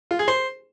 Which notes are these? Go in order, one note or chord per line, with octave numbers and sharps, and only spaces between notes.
F4
G#4
C5